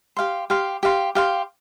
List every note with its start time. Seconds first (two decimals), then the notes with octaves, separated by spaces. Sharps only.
0.17 G4 F5 C6
0.50 G4 F5 C6
0.83 G4 F5 C6
1.15 G4 F5 C6